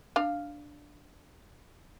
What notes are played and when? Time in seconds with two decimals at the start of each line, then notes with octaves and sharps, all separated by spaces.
0.16 D4 F5